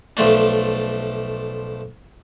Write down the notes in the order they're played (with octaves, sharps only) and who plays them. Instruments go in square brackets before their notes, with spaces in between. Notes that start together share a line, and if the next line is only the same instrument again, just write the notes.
[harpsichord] B1 F3 A3 D4